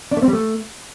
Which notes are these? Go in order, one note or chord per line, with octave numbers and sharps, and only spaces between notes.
D4
A3
C4
G3
A3